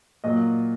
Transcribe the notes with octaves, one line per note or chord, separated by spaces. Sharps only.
A#2 F#3 D#5